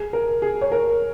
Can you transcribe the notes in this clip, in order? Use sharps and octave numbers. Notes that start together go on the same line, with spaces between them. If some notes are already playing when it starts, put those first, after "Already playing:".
Already playing: G#4
A#4
G#4
C#5
A#4